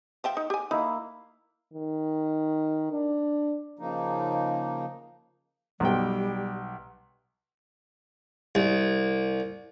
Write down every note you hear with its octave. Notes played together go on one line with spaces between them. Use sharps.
F3 E5 G5
D#4
G4 G#5
A#3 D#4 E4
D#3
D4
C#3 F3 A#3 D#4
B1 G3 G5
C2